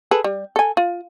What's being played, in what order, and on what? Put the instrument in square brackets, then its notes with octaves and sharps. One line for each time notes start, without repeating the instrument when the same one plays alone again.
[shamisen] G#4 A4 B4
G3
A4 G#5
F4